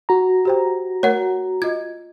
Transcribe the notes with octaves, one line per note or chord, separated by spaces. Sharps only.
F#4 A#5
G4 C5 G5
A3 A#4 C#5 F#5
F4 D#5 G#6